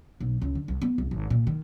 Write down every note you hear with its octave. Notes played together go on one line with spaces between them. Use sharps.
B1
C#2
D3
C2
B3
C2
G#1
A#2
D#3